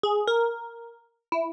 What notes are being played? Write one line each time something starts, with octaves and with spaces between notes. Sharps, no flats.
G#4
A#4
E4